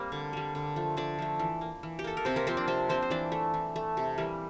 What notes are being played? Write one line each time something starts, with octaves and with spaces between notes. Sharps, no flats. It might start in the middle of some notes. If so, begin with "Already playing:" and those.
Already playing: G3 A#3 C4
D3
G3 A#3
D3
F3 A3
D3 D4 D5
F3 A3
E3
A#3
E3
G4
A#3 A4
A#4
C3 C4 C5
A#3 A#4
F3 A#3 C4 C5
D4 D5
C3 C4 C5
F3 A#3 C4 C5
C5
E3 D4 D5
A3
E3
A3
C3
E3 G3 A#3